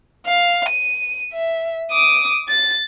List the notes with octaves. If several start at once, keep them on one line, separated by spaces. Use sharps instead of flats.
F5
D#7
E5
D6 D#6
A6